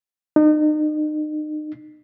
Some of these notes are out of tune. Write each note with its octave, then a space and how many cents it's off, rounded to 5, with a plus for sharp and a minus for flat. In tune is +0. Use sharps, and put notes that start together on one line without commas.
D#4 -35